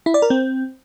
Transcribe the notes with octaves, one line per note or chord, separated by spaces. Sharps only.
E4
D5
A#4
C4